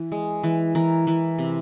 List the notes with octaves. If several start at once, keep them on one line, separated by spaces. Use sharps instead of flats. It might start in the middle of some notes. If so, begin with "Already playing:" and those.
Already playing: E3
G#3
E3
E3 A#4
E3
C3